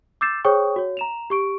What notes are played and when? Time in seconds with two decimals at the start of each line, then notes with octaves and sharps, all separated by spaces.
0.21 D6 E6 G6 A6 C7 E7
0.44 G#4 C5 C#5 G5 C#6 D#6
0.76 F#4 C#5
0.97 A#5 E7 F7
1.30 G4 C#6 D7